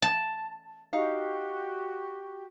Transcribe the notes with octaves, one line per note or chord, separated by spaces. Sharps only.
A5
D#4 F#4 G4 F5